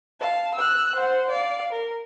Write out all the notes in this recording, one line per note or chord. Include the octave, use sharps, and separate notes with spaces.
F5 A5
E6 F#6
C5 F#5
D5 F5
A#4